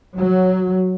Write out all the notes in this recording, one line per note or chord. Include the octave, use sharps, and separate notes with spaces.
F#3